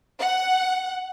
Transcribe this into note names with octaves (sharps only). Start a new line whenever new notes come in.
F#5